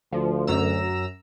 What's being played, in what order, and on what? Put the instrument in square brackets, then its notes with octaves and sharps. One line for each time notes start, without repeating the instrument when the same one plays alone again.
[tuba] D2 [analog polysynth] F3
[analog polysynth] F#2 A#5 E6